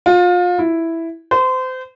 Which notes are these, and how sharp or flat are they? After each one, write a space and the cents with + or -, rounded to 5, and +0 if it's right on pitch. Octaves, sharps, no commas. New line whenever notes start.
F4 +30
E4 +0
C5 -30